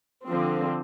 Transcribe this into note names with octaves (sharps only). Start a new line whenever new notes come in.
D3 F3 C4